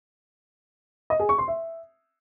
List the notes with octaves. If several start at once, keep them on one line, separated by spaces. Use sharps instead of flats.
D#5
G#4
C#6
C6
E5